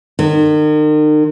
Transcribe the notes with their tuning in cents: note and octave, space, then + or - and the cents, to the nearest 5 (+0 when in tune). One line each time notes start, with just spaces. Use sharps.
D#3 -40